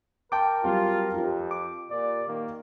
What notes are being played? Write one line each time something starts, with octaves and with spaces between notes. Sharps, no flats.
A#4 G5 A5 C6 D6
F#3 G3 C4 F4
F2 F4 G4
D6
A#2 D5
D#3 A#3